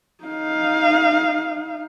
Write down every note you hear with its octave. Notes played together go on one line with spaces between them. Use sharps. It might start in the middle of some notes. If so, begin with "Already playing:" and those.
D#4 F5